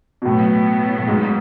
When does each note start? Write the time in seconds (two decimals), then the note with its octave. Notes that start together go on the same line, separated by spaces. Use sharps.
0.22 B2
0.26 A2 F#3 B3 E4
0.98 A2
1.08 G#2